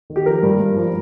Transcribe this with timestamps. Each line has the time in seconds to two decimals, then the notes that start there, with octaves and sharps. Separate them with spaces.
0.10 D#3
0.16 G4
0.26 F3 A#4
0.43 G2
0.60 G2
0.76 F3